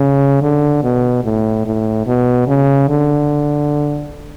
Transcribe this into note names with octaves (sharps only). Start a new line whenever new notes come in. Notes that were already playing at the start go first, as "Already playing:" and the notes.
Already playing: C#3
D3
B2
A2
A2
B2
C#3
D3